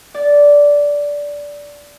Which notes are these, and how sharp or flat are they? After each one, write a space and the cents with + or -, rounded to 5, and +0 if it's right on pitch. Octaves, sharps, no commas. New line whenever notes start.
D5 -10